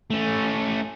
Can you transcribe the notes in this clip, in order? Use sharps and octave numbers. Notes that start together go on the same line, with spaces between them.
A3 C#4